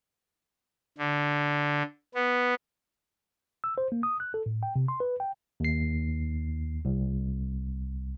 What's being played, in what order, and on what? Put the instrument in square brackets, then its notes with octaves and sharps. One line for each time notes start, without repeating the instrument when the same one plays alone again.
[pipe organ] D3
B3
[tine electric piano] E6
C5
A#3
D#6
F#6
A4
A2
G5
C3
C6
B4
G5
D#2 C7
C2